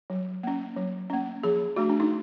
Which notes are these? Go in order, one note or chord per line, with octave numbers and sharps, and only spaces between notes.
F#3
A#3 C#4
F#3
A#3 C#4
F3 G#4
A3 D4 F#4
D4
D#4